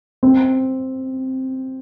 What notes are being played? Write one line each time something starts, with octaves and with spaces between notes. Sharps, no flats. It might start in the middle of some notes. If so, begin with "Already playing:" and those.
C4